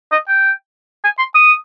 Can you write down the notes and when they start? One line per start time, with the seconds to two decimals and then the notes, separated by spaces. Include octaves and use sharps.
0.12 D#5
0.28 G5
1.04 G#5
1.19 C6
1.35 D#6